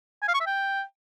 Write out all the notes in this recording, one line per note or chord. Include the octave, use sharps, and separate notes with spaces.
G#5
F5
C#6
E5
G5